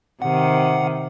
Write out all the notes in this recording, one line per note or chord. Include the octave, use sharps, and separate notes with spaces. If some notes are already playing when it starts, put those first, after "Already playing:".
C3 D#3 F#5